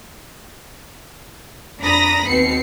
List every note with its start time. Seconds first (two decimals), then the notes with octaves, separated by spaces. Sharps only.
1.81 F2 D4 A#5 B5 D#6 A#6
2.29 D#2 B2 C4 C7 C#7